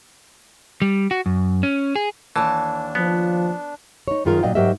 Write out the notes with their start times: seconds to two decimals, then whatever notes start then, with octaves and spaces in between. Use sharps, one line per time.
0.82 G3
1.11 F#4
1.26 F#2
1.63 C#4
1.96 G#4
2.36 D#2 E3 D4 A5
2.95 F3 B3
4.08 D#4 C#5
4.25 F#2 D#3 D#4 F4 G#4 A#4
4.43 A#2 F#3 D5 D#5 F5 G5
4.55 G#2 F#3 G4 A#4 D#5 E5